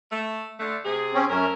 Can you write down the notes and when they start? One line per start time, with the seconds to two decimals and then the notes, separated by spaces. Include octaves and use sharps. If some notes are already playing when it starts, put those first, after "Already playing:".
0.10 A3
0.60 D3 A3
0.84 C3 G#4
1.14 C4 C#4
1.29 F#2 A3 C#4 A#4